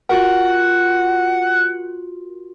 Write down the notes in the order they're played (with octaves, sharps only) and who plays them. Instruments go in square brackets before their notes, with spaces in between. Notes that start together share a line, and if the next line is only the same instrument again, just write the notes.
[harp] F4 F#4 A#4 [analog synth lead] F#5